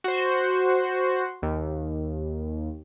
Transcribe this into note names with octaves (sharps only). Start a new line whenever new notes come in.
F#4 C5
D#2